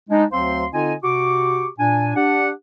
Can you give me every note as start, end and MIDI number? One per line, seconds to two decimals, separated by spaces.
0.10 0.25 56
0.10 0.25 62
0.10 0.25 63
0.32 0.66 38
0.32 0.66 54
0.32 0.66 60
0.32 0.66 72
0.32 0.66 77
0.32 0.66 84
0.73 0.93 50
0.73 0.93 60
0.73 0.93 63
0.73 0.93 65
0.73 0.93 75
0.73 0.93 80
1.03 1.67 48
1.03 1.67 66
1.03 1.67 67
1.03 1.67 85
1.03 1.67 86
1.79 2.13 46
1.79 2.13 62
1.79 2.13 80
2.16 2.50 62
2.16 2.50 67
2.16 2.50 78